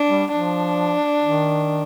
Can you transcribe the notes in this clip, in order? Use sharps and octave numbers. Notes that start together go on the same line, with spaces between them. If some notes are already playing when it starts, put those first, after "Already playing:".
Already playing: D4
G3
F3 D4
D#3